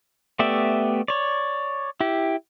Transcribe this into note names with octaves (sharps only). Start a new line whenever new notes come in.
A3 B3 G4 D5 E5
C#5 D5
E4 G4